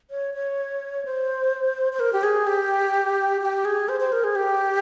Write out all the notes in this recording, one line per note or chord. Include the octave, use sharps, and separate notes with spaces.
C#5
C#5
C5
C5
A#4
G4
G#4
G4
G4
G#4
C5
C5
A#4
G#4
G4